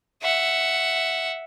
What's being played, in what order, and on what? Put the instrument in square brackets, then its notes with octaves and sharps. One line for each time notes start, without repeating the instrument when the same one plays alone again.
[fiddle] E5 F#5